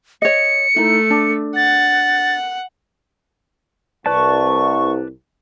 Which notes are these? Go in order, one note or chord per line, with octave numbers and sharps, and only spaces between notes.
C#5 D#5 C#7
A3 D#4 E4
D4
F#5 A6
C2 B4 D5 A5 C#6